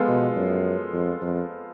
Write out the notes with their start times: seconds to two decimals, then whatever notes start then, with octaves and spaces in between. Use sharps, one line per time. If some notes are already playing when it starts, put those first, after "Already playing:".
Already playing: F3 G#3 B3 F4 A4
0.08 B2
0.36 F#2
0.93 F2
1.22 F2